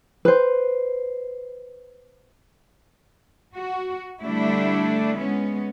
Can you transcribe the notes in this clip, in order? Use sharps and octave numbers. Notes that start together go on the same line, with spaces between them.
B4 C5
F#4
D3 G3 A3 D4 E4
G#3 B3 C#4